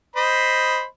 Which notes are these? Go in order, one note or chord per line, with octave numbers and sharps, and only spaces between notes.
C5 D#5 B5